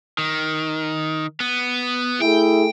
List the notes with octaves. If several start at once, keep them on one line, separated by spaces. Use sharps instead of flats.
D#3
B3
A3 E4 G#4 G5